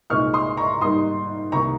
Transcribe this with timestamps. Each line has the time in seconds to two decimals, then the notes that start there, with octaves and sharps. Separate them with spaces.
0.10 C2 A#2 G#3 C4 D#4 C#6 F6
0.34 C6 D#6
0.57 A#5 C#6
0.81 G#2 G3 A#3 D#4 C6 D#6
1.52 C2 C3 D#3 A#3 A#5 C#6